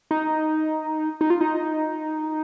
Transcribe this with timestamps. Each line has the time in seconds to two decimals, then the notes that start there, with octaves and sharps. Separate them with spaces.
0.11 D#4
1.21 D#4
1.30 F4
1.41 D#4